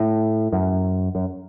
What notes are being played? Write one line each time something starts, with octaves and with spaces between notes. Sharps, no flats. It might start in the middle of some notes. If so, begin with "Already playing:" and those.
Already playing: A2
F#2
F#2